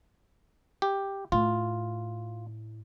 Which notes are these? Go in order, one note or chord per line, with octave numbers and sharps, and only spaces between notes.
G4
A2 F4